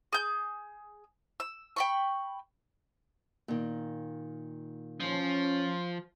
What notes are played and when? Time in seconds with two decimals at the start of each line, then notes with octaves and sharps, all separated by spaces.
0.13 G#4 G6
1.40 E6
1.76 G5 B5 C#6
3.48 A#2 D#3
5.00 F3 C#4